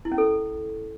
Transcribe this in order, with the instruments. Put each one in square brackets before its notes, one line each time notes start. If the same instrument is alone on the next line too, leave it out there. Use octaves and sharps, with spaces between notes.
[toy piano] E4
C#4
A4